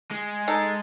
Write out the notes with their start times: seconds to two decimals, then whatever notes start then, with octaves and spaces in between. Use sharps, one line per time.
0.11 G#3
0.48 D#4 A4